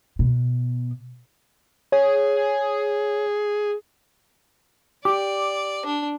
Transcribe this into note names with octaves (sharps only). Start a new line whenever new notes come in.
B2
G#4 C#5
G4 D5 D6
D4